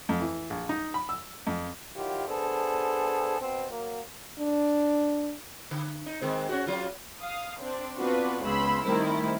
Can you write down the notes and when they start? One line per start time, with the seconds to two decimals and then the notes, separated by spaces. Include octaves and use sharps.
0.09 F2
0.21 E3
0.50 A#1
0.69 D#4
0.94 B5
1.09 E6
1.47 F2
1.96 D#3 F#3 E4 F4 G4
2.27 B3 D4 G#4 A4 C5
3.40 B2 C4
3.71 F#3 A#3
4.40 D4
5.71 D3
6.06 D#4
6.21 D#3 G#3 C4
6.49 C#4 F#4
6.67 F#3 F4
7.21 F5 D#6
7.61 C4 D4
7.98 B3 C4 D4 F4 F#4 B4
8.43 C#2 C#3 B3 B5 C6 E6
8.85 D#3 G3 A3 C4 E4